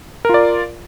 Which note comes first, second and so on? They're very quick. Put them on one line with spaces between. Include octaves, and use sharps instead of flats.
A#4 F4 D5